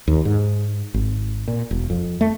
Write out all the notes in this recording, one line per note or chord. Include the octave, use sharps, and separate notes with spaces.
D#2
G#2
G#1
A#2
E1
F2
A3